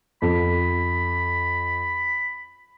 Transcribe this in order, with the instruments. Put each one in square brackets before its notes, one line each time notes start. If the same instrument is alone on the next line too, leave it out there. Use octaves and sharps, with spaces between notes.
[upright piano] F2 [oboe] B5